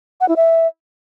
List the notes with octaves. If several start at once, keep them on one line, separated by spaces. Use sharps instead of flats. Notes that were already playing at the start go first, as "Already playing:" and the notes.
F#5
E4
E5